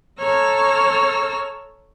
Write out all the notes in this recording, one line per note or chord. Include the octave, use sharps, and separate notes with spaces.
A4 C#5 A#5 E6 F6